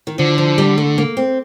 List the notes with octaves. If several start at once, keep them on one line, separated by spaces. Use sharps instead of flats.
D#3
D3 F3
F3
G3
A3
A#3
C4